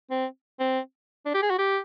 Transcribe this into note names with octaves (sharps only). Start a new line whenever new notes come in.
C4
C4
D4
G4
G#4
F#4
G4